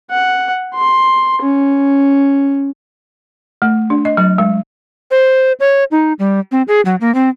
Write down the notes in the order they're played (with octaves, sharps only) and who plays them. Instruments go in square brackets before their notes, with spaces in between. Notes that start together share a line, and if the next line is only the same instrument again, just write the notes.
[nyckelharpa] F#5
C6
C#4
[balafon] A3
D4
D#5
F#3
G#3
[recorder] C5
C#5
D#4
G3
C4
G#4
F#3
A#3
C4